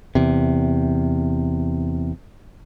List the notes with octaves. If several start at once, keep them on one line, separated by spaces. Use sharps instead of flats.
E2 C3